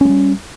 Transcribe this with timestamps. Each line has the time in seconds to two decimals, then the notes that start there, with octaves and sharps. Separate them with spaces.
0.01 C#4
0.05 G#3
0.09 G3